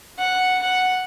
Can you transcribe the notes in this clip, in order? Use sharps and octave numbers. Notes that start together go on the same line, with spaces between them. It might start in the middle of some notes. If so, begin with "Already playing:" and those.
F#5
F#5